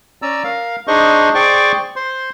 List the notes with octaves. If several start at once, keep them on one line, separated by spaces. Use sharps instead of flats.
C#4 D5 A#5 E6
A#4 F5
D4 D#4 G#4 C5 D#5 C#6
G#4 C5 D5 G5 C#6 D6
C5 C6